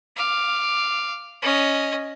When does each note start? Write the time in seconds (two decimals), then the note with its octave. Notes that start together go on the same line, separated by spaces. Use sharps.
0.17 F5 D6
1.42 C#4 D#5